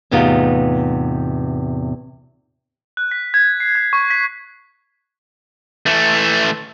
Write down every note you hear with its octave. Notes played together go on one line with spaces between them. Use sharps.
E2 A2 C3 B3 D#4 F4
F#6
B6
G#6
C7
G#6
C#6
B6
E3 A3